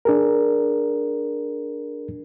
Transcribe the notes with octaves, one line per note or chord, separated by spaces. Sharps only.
D4 G#4 A#4